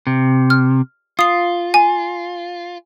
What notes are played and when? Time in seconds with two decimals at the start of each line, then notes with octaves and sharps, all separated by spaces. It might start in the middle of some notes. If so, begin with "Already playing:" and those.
0.07 C3
0.50 F6
1.19 F4 D#6 C7
1.74 G#5